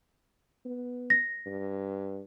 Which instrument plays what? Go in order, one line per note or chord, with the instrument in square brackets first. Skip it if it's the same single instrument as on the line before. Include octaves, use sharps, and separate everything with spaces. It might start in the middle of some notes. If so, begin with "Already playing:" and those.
[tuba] B3
[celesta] A#6
[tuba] G2